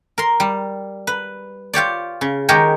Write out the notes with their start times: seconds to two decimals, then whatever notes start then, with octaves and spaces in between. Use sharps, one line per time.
0.18 A#4 C6
0.40 G3
1.07 B4
1.73 F4 G4 C#5 D5
2.21 C#3
2.49 D#3 G#3 G4 A#4 C#5